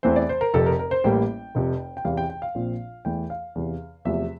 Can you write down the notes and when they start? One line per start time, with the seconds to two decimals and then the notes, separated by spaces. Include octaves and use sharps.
0.03 E2 E3 A3 C4 C5
0.16 D5
0.29 C5
0.41 A#4
0.53 F1 F2 C3 A4
0.66 A#4
0.79 A#4
0.91 C5
1.04 A1 A2 G3 A#3 G5
1.55 F1 F2 C3
1.97 G5
2.05 E2 C3 E3 F5
2.17 G5
2.30 G5
2.42 F5
2.55 A#1 A#2 F3 C4
3.05 E2 E3 A3 G5
3.30 F5
3.55 E2 C3 E3
4.05 E2 C3 F3 A3 E5